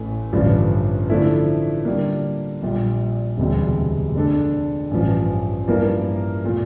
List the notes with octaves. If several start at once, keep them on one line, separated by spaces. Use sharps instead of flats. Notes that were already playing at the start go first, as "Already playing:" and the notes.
Already playing: A1 A2 E3 A3
A1 G2 D3 F3
D3 F3 A3 E4 A4
D3 G3 A#3
A#1 A#2 G3
E1 D2 C3 G3
F2 D3 A3 D4 A4
A1 G2 F3
G2 F3 A#3 E4 A#4
A#2 A3